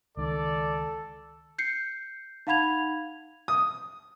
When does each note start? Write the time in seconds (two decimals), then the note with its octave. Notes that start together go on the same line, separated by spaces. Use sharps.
0.17 C#2 D#3 A4 D5
1.58 G6 C7 C#7
2.47 D#4 F5 F#5 B5 G#6 F7
3.48 D#6